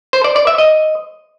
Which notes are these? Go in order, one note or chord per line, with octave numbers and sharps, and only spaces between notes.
C5
D5
D5
E5
D#5